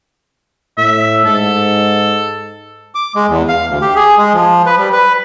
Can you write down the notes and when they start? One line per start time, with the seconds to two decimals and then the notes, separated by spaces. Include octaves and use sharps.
0.78 A2 E5
1.25 G#2 A4
2.95 D6
3.15 G#3
3.28 E2
3.48 F5
3.68 D2
3.82 G4
3.95 G#4
4.17 G#3
4.34 F3
4.66 B4
4.78 G3
4.92 B4